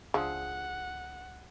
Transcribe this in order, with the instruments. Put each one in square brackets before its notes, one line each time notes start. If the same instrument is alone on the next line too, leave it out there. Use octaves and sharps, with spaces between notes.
[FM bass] C#2 [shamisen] F3 [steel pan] D4 G#4 E6 [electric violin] F#5